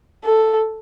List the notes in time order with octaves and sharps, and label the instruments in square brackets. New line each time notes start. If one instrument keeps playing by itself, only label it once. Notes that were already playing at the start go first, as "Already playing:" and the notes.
[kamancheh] A4